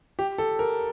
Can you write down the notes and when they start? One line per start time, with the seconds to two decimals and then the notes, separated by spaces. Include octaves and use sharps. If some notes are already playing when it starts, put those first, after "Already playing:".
0.19 G4
0.38 A4
0.59 A#4